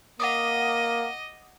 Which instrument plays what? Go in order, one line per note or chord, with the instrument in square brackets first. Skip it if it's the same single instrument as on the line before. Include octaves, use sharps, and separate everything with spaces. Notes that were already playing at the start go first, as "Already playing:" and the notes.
[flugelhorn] A#3 [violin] D#5 [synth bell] F#5 D6 D#6